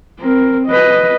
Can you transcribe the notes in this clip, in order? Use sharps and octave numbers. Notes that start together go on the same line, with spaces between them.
C4 A#4
B4 D#5